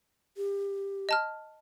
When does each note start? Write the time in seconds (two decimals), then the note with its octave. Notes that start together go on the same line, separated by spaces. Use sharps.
0.37 G4
1.09 D#5 A5 F6